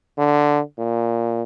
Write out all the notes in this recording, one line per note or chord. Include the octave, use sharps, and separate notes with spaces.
D3
A#2